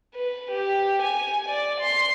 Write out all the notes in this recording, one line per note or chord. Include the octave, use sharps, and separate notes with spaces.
B4
G4
G#5
D5
C6